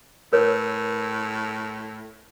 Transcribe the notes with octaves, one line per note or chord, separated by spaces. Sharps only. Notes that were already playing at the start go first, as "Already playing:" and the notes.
A2 A#4 B4 C#5